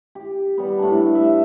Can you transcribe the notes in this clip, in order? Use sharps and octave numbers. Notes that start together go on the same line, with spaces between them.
G4
G3 B3
A2 D4
E5